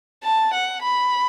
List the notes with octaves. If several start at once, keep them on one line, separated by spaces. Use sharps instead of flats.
A5
F#5
B5